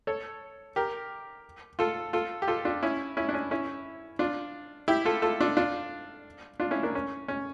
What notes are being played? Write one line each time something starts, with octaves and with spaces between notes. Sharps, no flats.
A4 C#5
G4 A#4
F4 A4
F4 A4
G4
F4 A4
D4 F4
C#4 E4
C#4 E4
D4
C#4
C#4 E4
D4 F4
E4 G4
F4 A4
F4 A4
D4 F4
D4 F4
D4 F4
C#4 E4
A#3 D4
C#4
C#4